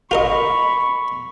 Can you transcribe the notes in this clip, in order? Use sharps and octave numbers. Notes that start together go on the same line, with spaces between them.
F4 A#4 D#5 B5 C#6